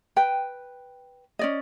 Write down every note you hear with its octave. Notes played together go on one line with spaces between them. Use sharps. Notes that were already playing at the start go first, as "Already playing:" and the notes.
B4 G5
C#4 D5 D#5